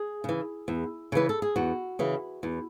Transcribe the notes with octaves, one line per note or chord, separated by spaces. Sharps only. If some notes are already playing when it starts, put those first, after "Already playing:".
Already playing: G#4
C#3 E3
E2
C#3 E3 B4
A4
G#4
E2 F#4
C#3 E3
E2